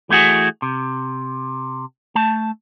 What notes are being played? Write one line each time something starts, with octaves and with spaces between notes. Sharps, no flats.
E3 A3 E4 F#4 G#4
C3
A3 A5